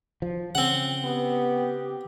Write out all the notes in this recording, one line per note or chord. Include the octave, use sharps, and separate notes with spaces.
F3
C#3 C4 F#5
B3 G4